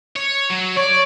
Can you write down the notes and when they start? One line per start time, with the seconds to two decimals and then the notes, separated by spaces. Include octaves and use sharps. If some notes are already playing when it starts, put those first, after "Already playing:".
0.16 C#5
0.50 F#3
0.77 C#5 D5